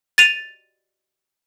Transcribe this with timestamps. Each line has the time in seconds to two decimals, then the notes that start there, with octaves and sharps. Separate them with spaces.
0.18 A6 D#7 F7